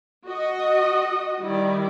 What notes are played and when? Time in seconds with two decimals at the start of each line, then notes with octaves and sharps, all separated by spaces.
0.25 F#4 D#5
1.41 D#3 G3 E4 D5